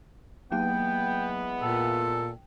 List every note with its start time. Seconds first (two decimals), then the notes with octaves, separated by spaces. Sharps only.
0.52 E3 F#3 G#3 A#3 B3 G5 F#6
1.62 A#2 A4 G5